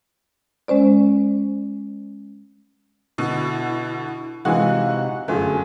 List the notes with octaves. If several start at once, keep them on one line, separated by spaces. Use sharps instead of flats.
G#3 C#4 C5 D5
B2 D3 E4
C3 E3 G#3 D#4 F#4 F5 F#5
G1 F#2 D3 A3 F4 G#4 G#5